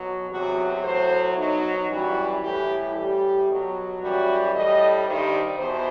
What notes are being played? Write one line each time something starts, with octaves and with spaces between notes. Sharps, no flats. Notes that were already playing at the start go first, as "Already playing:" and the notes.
Already playing: B2 F#3
E2 C3 F#3 F#4
A2 F#3 C5
B2 F#3 D#4
F#2 E3 G3 F#4
A2 E3 G3 G4
A2 G3 G4
B2 F#3
F#2 E3 G3 F#4
A2 G3 D#5
G2 D#3 G3 C5
E2 B2 C5